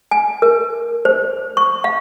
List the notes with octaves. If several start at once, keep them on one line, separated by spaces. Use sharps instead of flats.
G#5
A#4
C5
C#6
F5